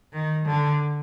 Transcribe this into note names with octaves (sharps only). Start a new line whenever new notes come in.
D#3
D3